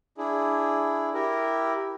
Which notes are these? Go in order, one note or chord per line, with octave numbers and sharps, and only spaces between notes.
D4 E4 G#4
E4 G4 A#4